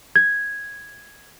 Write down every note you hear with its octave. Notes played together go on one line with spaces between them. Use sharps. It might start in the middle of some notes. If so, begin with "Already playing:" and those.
G#6